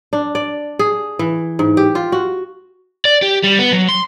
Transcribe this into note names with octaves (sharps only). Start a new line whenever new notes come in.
D4
D5
G#4
E3
G#2
G4
F4
F#4
D5
G4
G3
B3
F#3
C6